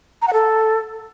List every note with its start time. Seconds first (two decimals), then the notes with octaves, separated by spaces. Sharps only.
0.22 A#5
0.28 F#5
0.33 A4